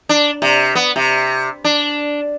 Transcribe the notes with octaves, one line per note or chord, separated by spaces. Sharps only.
D4
C3
B3
C3
D4